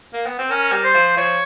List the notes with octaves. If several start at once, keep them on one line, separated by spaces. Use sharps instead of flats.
A#3
B3
C4
C#4 A#4
G3
C5
F3
F3 C#5